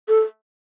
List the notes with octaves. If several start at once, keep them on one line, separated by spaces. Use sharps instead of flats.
A4